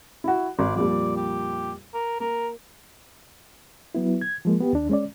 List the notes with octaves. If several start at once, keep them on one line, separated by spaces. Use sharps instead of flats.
E4 F#4
G#1 D5
F2 A#2 G3 D5
G4
A#4
A#3 A#4
F#3 B3 E4
G#6
F3 G#3 A#3
B3 G4
D#2 D4
G#3 C#4 D5